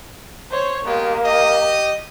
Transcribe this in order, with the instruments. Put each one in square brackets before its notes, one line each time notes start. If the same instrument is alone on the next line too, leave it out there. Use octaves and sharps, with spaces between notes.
[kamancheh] C5 C#5
[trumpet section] G#3 B3 G4 [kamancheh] A#3
[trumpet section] G4 D#5